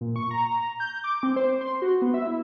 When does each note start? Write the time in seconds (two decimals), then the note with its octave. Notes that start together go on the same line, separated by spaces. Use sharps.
0.01 A#2
0.16 C#6
0.31 A#5
0.80 G6
1.04 D6
1.23 C4
1.36 C5
1.61 C6
1.82 F#4
2.02 B3
2.14 E5
2.26 E4